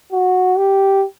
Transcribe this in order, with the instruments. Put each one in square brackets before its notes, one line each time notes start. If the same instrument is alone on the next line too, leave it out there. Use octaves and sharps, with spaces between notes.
[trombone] F#4
G4